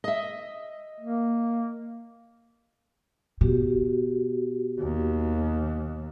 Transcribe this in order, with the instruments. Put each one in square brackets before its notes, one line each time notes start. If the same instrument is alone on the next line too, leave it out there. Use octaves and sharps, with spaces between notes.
[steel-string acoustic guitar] D#5 E5
[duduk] A#3
[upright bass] B2 [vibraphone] F#4 G4
[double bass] D#2